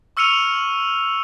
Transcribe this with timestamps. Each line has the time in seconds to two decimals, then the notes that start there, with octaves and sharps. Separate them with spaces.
0.17 C#6 E6 F6 C#7 D#7 F7